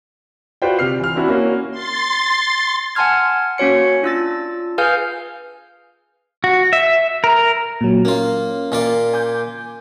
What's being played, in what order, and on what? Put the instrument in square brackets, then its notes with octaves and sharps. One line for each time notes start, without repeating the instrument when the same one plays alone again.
[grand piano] F4 F#4 B4 C5 D5 G5
C3 F6 C7
E3 F6
C4 D4 E4 F#4
A#3 C#4 F#4
[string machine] C6 A6
[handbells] F#5 G#5 A5 C6 F6 G#6
A#3 C#4 F#4 C#5 C#7
D4 F4 E6 A6
G#4 B4 F5 G#5 F6 G6
[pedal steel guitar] F#4
E5
A#4
[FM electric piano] A#2 F#3
[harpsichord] A#3 F4 [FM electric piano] C#4
[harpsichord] A#2 F4 D5
[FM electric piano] G#5 D6 G6